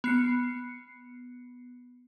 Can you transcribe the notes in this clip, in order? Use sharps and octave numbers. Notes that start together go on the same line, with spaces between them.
B3 C7 C#7